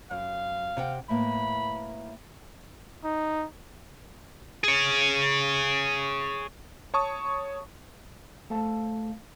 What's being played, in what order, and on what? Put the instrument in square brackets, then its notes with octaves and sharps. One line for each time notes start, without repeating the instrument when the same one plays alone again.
[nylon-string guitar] F#2 [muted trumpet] F5
[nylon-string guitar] C3 F#5 G5
[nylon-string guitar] A2 A#3 B3 [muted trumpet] B5
[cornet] D#4
[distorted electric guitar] G#4 C#5
[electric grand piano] C#5 A5 C#6 D#6
[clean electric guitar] A3 A4 C5 F5 A5